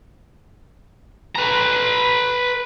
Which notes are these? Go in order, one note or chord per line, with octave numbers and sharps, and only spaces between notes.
B4 A#5